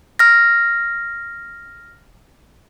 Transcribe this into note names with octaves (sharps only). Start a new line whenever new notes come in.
F6 A#6